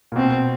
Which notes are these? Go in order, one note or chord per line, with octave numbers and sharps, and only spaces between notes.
A#2
B2 C4